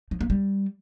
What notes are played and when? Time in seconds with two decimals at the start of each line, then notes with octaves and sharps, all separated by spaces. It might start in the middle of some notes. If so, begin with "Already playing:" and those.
0.11 F3
0.21 A#3
0.30 G3